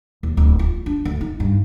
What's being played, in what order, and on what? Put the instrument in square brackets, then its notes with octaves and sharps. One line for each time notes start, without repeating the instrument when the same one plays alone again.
[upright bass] D#2
D1
F4
D4
D2
D#4
G2